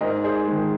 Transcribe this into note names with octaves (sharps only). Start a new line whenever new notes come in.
G#2 A#4 D#5
G#4 C5
D#3 G#3